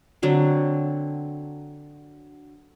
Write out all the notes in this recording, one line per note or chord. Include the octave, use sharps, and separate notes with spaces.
D3 F#3 C4